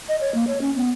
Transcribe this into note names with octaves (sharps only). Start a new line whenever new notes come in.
D#5
C#5
A#3
C#5
C#4
B3